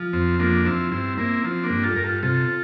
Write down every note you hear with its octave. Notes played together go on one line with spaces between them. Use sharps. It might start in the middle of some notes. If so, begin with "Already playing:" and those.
Already playing: F3
F2 C4
F3 A#3 D4
F3 C4 E4
G2 C4 E4
A#3 C4 E4
F3 C4
A#3 D4
G2
F4 A4
G2 A#4
F4 A4
C3 F4 A4